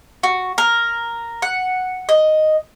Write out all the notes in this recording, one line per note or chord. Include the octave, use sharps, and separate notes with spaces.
F#4
A#4
F#5
D#5